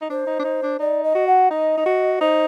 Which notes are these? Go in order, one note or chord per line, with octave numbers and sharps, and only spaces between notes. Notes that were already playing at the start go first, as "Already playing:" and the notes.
D#4
D4 C5
D#4
D4
D#4
D4
D#4 D5
D#5
F#4
F#5
D#4 D#5
D#4
F#4
D#4 C5